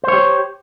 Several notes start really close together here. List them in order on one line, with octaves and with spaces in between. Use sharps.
C5 C#5 G4